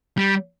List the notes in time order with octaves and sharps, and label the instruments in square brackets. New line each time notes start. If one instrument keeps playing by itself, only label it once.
[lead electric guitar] G3